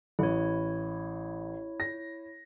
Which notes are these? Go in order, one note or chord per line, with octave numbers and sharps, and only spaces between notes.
A1 E4 C#5
A#6